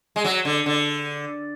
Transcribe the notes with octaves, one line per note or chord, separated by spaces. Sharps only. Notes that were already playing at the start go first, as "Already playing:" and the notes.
G#3
F#3
D3
D3